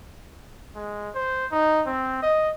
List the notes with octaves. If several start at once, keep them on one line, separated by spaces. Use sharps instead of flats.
G#3
C5
D#4
C4
D#5